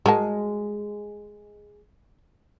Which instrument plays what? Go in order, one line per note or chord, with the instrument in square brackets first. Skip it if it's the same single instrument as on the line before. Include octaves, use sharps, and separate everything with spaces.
[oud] G#3 [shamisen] F#4 A#4 A5